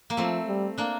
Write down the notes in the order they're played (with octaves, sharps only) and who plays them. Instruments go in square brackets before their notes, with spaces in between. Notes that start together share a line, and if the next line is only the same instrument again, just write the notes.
[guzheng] A#3
[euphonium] F3 [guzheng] A3 C4
[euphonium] G3
[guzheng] A#3 D4